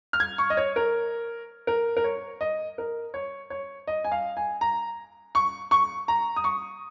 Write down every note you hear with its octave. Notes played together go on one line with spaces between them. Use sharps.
F6
G#6
C#6
D#5
C#5
A#4
A#4
A#4
C#5
D#5
A#4
C#5
C#5
D#5
G#5
F5
G#5
A#5
C#6
C#6
A#5
D#6
C#6